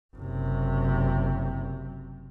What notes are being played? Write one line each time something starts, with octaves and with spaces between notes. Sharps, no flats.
F#1 C3